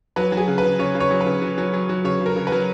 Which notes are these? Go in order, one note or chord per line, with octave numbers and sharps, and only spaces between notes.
F#3 B4
F#3
G#4
C#3
B4
C#3
C#3 C#5
C#3
C#5
F#3
B4
C#3
F#3
F#3
F#3
F#3
C#3 C#5
C#3
A#4
C#3
B4
F#3